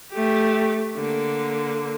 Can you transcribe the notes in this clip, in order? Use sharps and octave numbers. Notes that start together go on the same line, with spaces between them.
A3 G4
D3 A#3